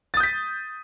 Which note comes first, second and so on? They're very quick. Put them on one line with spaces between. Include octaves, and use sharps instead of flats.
A6 D#6 G6 B6